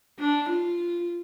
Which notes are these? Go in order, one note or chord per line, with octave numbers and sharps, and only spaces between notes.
D4
F4